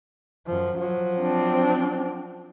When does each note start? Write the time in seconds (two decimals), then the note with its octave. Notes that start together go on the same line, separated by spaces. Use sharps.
0.46 F#2 F3
0.78 F3 F#3
1.20 C4 D4